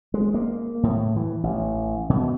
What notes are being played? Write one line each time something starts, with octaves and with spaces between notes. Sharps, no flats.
G#3
A#3
A2
E3
A1
B2